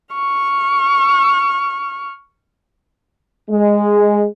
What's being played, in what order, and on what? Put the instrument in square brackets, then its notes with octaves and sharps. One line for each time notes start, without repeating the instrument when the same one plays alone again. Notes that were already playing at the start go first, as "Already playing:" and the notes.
[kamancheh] C#6 F6
[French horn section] G#3